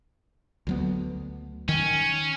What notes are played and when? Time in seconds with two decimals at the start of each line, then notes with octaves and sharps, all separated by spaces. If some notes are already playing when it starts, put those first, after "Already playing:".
0.67 D2 F#3 B3
1.69 D#3 C#4